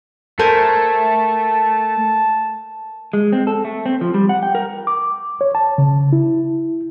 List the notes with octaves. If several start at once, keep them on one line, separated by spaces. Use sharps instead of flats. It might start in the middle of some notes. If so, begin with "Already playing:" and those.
A3 A#4 C5 G#5 A5
G#3
C4
A4
A3
C4
F3
G3
F#5
G5
A#4
D6
C#5
A5
C#3
E4